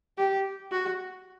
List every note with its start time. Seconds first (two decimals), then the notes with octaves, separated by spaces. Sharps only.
0.18 G4
0.72 F#4